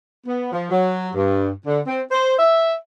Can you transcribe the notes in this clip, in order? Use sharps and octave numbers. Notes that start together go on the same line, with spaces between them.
B3
F3
F#3
G2
D3
C4
C5
E5